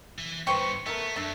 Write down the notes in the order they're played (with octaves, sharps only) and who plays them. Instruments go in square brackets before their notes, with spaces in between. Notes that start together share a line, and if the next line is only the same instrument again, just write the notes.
[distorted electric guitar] E3
[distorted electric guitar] G2 D3 [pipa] B4 C5 G5 [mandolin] C#6
[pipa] A3 A#4 [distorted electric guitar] B3
[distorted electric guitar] F#2 [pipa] A3 D4 E5